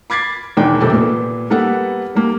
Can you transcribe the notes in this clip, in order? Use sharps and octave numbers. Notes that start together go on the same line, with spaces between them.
B5 D6 G#6 A6 C7
E1 E2 D#3 D4 G5
D#1 F2 C3 C4 A4
A#2 B3
G3 A#3 B3 A4 B4 F#5
G3 A#3